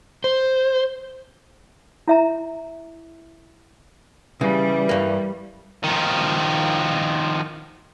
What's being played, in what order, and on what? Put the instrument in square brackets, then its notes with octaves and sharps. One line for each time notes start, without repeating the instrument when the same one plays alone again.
[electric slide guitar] C5
[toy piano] E4 E5 A#5
[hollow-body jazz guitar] C#3 [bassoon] E3 [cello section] G3
[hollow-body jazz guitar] G2 A#3
[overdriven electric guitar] D#3 F3